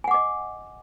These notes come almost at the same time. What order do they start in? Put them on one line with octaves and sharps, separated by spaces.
G#5 F#5 D6 D#5